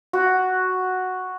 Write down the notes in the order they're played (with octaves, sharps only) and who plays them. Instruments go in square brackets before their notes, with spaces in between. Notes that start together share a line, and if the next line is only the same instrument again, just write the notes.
[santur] F#4